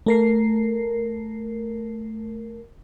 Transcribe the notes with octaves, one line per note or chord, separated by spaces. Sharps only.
A3 A#4 C7